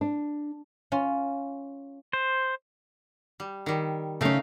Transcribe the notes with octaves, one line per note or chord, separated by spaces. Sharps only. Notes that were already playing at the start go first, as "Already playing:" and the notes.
D4
C#4 F4
C5
G3
D#3 G3
C#3 A3 C#4 D#4 F5